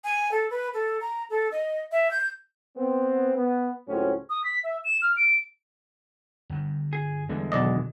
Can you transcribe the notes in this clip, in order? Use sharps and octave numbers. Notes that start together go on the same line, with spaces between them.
G#5
A4
B4
A4
A#5
A4
D#5
E5
G6
B3 C4
B3
C#2 A2 F#3 C4 C#4
D#6
B6
E5
E7
F6
D7
G1 G2
G#4
E2 D3 G3 G#3
B1 B2 D#3 D5 D#5